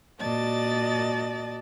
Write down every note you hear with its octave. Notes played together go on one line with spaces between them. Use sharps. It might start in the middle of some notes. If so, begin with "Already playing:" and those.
A#2 F#4 D5 D#5 A5 A6